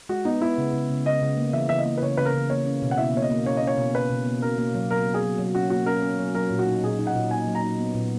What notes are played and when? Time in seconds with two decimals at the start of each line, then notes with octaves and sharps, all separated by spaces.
0.09 G#3 F#4
0.25 B3 D#4
0.41 B3 E4
0.58 C#3
0.73 C#3
0.90 C#3
1.06 C#3 D#5
1.22 C#3
1.37 A#3
1.53 E3 E5
1.69 E3 E5
1.78 D#5
1.86 A#3
1.98 B4
2.02 C#3 C#5
2.17 C#3 B4
2.25 A#4
2.34 C#3
2.50 A#3 C#5
2.66 C#4
2.82 B2
2.91 F#5
2.98 E4 E5
3.14 A#3 C#5
3.22 D#5
3.31 A#3
3.46 C#4 C#5
3.57 D#5
3.62 C#4
3.67 C#5
3.78 B2
3.95 B2 B4
4.10 B2
4.26 A#3
4.42 C#4 A#4
4.58 A#3
4.75 F#3
4.91 F#3 A#4
5.07 F#3
5.14 G#4
5.23 F#3
5.38 F#3
5.55 C#4 F#4
5.70 A#3 F#4
5.86 C#4 A#4
6.03 C#4
6.19 F#3
6.35 F#3 A#4
6.51 A#2
6.59 F#4
6.67 D#4
6.83 A#2 G#4
6.99 D#4
7.07 F#5
7.16 A#2
7.31 D#4 G#5
7.47 F#3
7.55 A#5
7.63 D#4
7.79 B3
7.95 A#2